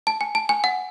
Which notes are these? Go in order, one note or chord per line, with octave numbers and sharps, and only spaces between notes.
A5
G#5
A5
G#5
F#5